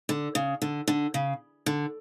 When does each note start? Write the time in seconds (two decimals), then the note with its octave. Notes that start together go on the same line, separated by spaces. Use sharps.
0.09 D3
0.35 C#3
0.62 D3
0.88 D3
1.14 C#3
1.66 D3